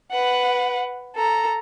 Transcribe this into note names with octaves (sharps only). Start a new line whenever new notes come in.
B4 F#5
A4 A#5